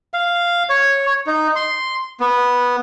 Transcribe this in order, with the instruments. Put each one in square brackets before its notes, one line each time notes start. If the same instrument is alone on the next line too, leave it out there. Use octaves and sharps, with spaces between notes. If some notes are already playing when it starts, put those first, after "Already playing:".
[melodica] F5
C#5
D#4
C6
B3